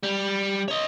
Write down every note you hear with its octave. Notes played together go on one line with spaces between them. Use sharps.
G3
C#5 D#5